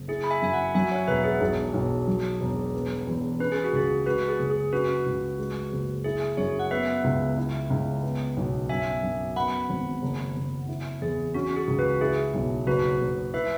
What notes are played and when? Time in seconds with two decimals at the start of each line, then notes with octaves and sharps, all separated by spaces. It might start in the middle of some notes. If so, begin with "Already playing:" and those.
Already playing: F#1
0.08 E4 G#4
0.24 B5
0.30 E5 G#5
0.42 F#2 G#5
0.53 F#5 B5
0.75 F#3 E5 G#5
0.91 C#5 F#5
1.08 E1 B4 E5
1.24 G#4
1.41 B1 G#4
1.74 B1
2.07 F#3
2.41 E1
2.73 B3
3.07 E2
3.39 C#4 B4
3.52 G#4
3.64 F#4
3.73 C#2 G#4
4.06 G#3 F#4 B4
4.28 G#4
4.39 F#1
4.50 G#4
4.73 C#4 F#4 B4
5.06 C#2
5.39 G#3
5.72 F#1
6.04 E4 G#4
6.37 F#2 G#4 C#5
6.59 F#5
6.71 B3 B4 E5
7.04 C#2
7.37 E4
7.70 C#2
8.03 B3
8.37 B1
8.69 F#2 E5 G#5
9.03 F#2
9.36 B3 F#5 B5
9.70 G#1
10.02 F#1
10.36 F#1
10.69 E4
11.02 E2 G#4
11.34 C#4 F#4
11.56 G#4
11.68 C#2
11.79 F#4 B4
12.01 E4 G#4
12.34 B1
12.67 F#1 F#4 B4
13.00 F#1
13.34 E4 B4 E5